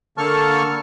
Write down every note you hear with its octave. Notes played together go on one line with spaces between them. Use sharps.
D3 A#3 A4 A5 C#6 F6